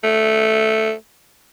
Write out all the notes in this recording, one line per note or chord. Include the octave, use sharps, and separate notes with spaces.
A3